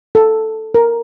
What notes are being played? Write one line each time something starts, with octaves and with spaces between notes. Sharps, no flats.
A4
A#4